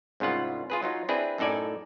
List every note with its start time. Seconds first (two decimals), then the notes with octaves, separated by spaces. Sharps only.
0.20 C2 G#2 C#3 F4 F#5
0.70 F4 G#4 B4
0.83 F#3 D#4 F4
1.09 C4 D4 E4 G#4 B4
1.38 F#2 A2 D#4 A4 D5 G#5